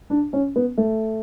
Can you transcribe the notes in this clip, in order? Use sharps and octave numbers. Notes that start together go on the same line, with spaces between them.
D4
C#4
B3
A3